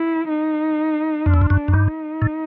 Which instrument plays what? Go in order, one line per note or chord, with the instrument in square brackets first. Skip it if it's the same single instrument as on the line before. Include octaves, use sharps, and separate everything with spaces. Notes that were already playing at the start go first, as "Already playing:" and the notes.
Already playing: [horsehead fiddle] E4
D#4
[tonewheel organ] F2 [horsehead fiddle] D4
[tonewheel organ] E2
F2
F#2
F#2
[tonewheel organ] G2 [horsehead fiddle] D#4
[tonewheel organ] A2